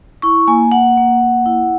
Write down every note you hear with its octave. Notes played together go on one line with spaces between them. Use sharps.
E4 C#6
A#3 G#5
A#3 F#5
A#3
A#3
E4